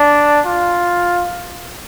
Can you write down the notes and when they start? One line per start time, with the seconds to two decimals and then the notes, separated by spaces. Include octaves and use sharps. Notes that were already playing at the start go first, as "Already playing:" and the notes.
Already playing: D4
0.45 F4